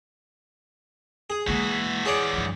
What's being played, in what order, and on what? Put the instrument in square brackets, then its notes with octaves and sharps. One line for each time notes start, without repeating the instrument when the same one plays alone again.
[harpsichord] G#4
[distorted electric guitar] E3 F#4 [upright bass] G#3 A#3
[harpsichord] G#4 C#5 D5
[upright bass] G2 F3